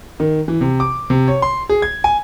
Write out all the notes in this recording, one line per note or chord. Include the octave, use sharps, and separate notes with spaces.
D#3
E3
C3
D6
C3
C#5
C6
G#4
G#6
G#5